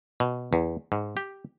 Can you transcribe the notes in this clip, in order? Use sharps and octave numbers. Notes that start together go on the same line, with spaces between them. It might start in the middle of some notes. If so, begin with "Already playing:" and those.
B2
E2
G#2
G4